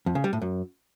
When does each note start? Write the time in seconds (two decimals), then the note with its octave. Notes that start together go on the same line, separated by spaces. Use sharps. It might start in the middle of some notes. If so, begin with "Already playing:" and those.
0.06 F2
0.15 C#3
0.24 G3
0.33 A2
0.42 F#2